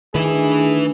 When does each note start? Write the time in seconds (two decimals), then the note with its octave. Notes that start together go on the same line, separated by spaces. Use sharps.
0.15 D2 D#3 E4 G#4 B4